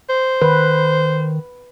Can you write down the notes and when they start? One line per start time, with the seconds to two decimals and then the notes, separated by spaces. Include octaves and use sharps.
0.10 C5
0.42 D#3 B4